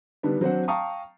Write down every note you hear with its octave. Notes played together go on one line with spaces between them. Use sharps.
D3 D#3 G3 B3 D4
F#3 C4 D4 C5 F#5
F5 G5 A5 A#5 C#6 D#6